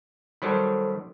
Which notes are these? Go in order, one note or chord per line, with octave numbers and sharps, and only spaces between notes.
D#3 F#3 G3 A4 C5 B5